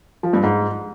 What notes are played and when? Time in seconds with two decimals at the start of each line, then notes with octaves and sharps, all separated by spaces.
0.23 F3
0.33 G2
0.43 G#2